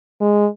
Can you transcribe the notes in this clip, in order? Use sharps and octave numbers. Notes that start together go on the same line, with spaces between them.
G#3